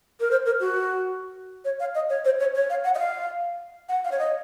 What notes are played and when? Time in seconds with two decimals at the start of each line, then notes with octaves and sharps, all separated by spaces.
0.20 A#4
0.31 C5
0.46 A#4
0.60 F#4
1.65 C#5
1.80 F5
1.95 D#5
2.10 C#5
2.25 C5
2.40 C#5
2.55 C#5
2.70 F5
2.84 F#5
2.95 D#5
2.99 F5
3.89 F#5
4.04 F5
4.12 C#5
4.19 D#5